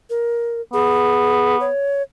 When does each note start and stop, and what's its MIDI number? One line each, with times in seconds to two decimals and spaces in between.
0.10 0.61 70
0.73 1.68 59
0.73 1.57 68
1.60 2.02 73